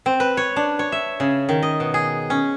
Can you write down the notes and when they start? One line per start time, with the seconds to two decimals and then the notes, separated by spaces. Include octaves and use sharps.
0.06 C4
0.20 B4
0.37 C#5
0.56 D4
0.79 C#5
0.92 E5
1.20 C#3
1.49 D#3
1.62 D#5
1.80 B2
1.94 G#4
2.30 C#4